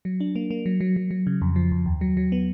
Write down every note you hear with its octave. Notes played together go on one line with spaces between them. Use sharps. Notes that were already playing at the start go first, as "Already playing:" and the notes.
F#3
D4
A#3
A#3
F#3
F#3
F#3
F#3
C#3
F2
F3
F2
D#2
F#3
F#3
B3